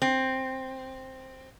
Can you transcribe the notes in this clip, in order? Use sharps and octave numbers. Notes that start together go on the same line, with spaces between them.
C4